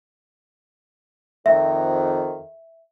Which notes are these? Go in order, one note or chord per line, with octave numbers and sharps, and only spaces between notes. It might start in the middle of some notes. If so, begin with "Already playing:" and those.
F2 D#3 E5